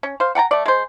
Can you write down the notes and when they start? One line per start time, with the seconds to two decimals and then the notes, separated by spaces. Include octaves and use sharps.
0.03 C#4
0.20 C5 F5
0.35 F#5 G5 A5 A#5
0.51 A3 D5
0.66 G#3 C5